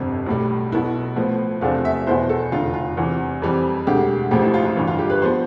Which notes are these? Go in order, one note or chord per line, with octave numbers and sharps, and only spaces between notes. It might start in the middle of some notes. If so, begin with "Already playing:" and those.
Already playing: G1 F2 C3
B1 A2 G3
B1 B2 B3 E4
A2 F3 B3
E2 C3 F3 A3 D4 F5
E5
E2 B2 B3 E4 C5
A4
F1 E2 D3 F4
F4
E2 C3 E3
F2 E3 G3 C4
E1 D2 D3 G4
A1 A2 F3 G4
E4
F4
F4
G1 G2 E3
F4
G4
B4
F3 B3 C5